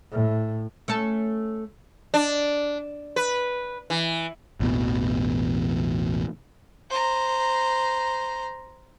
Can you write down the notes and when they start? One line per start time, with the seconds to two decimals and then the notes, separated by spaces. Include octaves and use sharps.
0.12 A2
0.88 A3 C#4 A4
2.14 D4
3.16 B4
3.90 E3
4.60 A1 E2 B2
6.90 C5 A#5